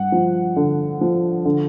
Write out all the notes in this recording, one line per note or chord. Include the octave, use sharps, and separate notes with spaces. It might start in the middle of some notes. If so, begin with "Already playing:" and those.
Already playing: G2 F#5
F3
D3
F3
D3